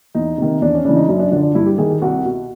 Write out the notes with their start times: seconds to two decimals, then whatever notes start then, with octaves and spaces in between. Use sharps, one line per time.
0.15 E2 D#4
0.38 C3 D#3
0.61 E2 D4
0.74 C#4
0.85 C#3 E3 D4
0.96 D#4
1.08 F#2 D4
1.20 D4
1.31 D3 F3 D4
1.43 D4
1.55 G2 E4
1.66 G4
1.78 D#3 G#4
1.90 G4
2.02 C2 F#4
2.25 B2